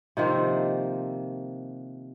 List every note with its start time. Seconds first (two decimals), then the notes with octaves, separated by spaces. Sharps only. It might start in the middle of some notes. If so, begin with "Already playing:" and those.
0.17 C3 D#3 F3 A#3